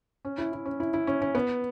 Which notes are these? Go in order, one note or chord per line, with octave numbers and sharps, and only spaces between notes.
C#4
E4
E4
C#4
E4
E4
C#4
C#4
B3